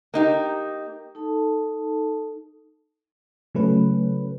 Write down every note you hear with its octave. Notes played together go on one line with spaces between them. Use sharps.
A#3 D#4 G4
D#4 A4 A5
C#3 F#3 A3 C#4 B4